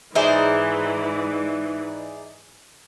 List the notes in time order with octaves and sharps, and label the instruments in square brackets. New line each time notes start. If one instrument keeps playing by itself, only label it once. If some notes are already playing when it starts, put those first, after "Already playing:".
[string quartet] G#2 E3 [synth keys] D#4 G#4 D5 [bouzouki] E4 C5